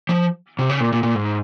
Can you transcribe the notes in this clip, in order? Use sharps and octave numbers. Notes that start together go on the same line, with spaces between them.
F3
C3
C#3
A#2
A#2
A#2
G#2